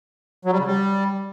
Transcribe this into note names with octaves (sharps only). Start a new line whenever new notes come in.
F#3
G3
C#3
G3